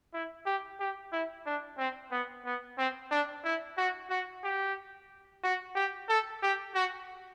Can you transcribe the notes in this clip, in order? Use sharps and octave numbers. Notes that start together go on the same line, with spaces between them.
E4
G4
G4
E4
D4
C4
B3
B3
C4
D4
E4
F#4
F#4
G4
F#4
G4
A4
G4
F#4